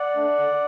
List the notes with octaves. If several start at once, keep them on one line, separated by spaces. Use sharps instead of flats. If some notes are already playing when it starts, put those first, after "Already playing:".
Already playing: D5 F#5
A3 D4
D3